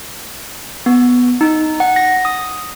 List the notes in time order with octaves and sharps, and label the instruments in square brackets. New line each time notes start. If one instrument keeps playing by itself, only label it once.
[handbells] B3
D#4
F#5
A#6
D#6